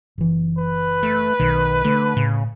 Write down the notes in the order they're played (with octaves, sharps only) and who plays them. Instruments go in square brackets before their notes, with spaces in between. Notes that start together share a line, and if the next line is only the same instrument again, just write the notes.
[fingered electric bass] F#1 E3
[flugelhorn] B4
[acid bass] A3
[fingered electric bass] B1 [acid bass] D#3
[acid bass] D3 [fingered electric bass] A3
[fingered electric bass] A2 [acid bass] C#3